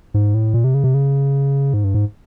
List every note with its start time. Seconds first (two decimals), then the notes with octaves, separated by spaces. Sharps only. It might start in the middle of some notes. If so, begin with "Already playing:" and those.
0.14 G#2
0.34 A2
0.54 A#2
0.64 C3
0.74 C#3
0.84 C3
0.94 C#3
1.74 G#2
1.84 G2
1.94 G#2